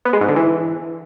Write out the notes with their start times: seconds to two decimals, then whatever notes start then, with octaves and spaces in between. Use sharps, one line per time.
0.05 B3
0.13 G#3
0.21 G#2
0.28 D3
0.36 E3